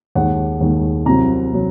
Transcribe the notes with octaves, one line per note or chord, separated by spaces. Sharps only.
D#2 D#3 G#3 F#5
D#2 D#3 G#3
C2 C3 F#3 A#5
C3 F#3